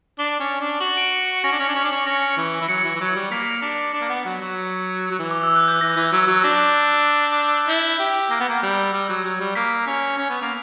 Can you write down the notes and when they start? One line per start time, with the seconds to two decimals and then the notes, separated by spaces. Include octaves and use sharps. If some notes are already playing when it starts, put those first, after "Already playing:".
0.19 D4 G7
0.40 C#4
0.61 D4
0.81 F#4 F#7
0.97 D7
1.13 C#7
1.28 C#7
1.44 C#4 A#6
1.52 D4
1.60 C#4
1.68 D4
1.75 C#4
1.84 D4
1.92 C#4
2.06 C#4 A#6
2.37 E3
2.62 E3
2.68 F#3 C#7
2.84 E3
2.95 E3
3.00 F#3
3.15 G3
3.31 A#3 B6
3.62 D4
3.93 D4
4.01 A#3
4.10 B3
4.25 F#3
4.41 F#3
5.11 F#3
5.19 E3
5.31 D6
5.43 E6
5.56 F#6
5.68 G6
5.81 E3 A#6
5.96 E3
6.12 F#3
6.27 F#3
6.44 D4 A#6
7.32 D6
7.44 E6
7.57 F#6
7.68 E4 G6
8.00 G4
8.30 A#3 A#6
8.40 B3
8.49 A#3
8.63 G3
8.93 G3
9.09 F#3
9.24 F#3
9.40 G3
9.55 A#3 B6
9.87 C#4
10.18 C#4
10.30 B3
10.42 A#3